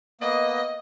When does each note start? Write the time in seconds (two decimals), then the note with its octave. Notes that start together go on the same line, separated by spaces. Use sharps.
0.21 A#3 B3 D#5 D#6